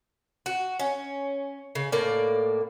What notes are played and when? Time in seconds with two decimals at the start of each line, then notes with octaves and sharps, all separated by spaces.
0.46 F#4
0.79 C#4
1.75 C#3
1.92 A2 A#3 D5